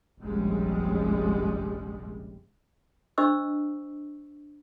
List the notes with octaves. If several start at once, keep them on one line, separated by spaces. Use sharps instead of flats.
F1 A#1 F#2 G3 G#3
D4 C5 D#5 C#6 E6